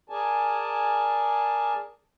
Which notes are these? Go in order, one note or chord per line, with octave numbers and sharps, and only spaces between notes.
G#4 A#4 D5 G#5 A5